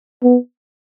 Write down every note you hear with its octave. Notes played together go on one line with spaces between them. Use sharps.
B3